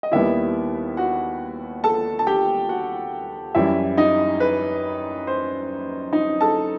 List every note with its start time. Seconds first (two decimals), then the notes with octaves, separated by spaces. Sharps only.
0.03 D#5
0.12 D#2 D#3 G3 B3 E4 E5
0.97 F#4 F#5
1.84 A4 A5
2.19 A5
2.27 G4 G5
2.69 F#4 F#5
3.55 F#2 E3 G3 E4 E5
3.97 D#4 D#5
4.40 B4
5.27 C5
6.13 D#4 D#5
6.41 A4 A5